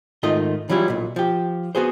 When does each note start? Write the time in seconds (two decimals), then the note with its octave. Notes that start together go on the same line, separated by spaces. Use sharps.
0.23 G#2 D#3 A3 F4 D#5
0.69 E3 F#3 G3 E4 F4
0.88 B1 A#2
1.16 F3 G4
1.75 B3 F#4 G#4 C5